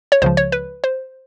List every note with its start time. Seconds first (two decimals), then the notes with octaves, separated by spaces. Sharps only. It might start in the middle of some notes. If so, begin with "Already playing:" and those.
0.12 C#5
0.22 C#2 C#3 F3 C5
0.37 C#5
0.52 B4
0.84 C5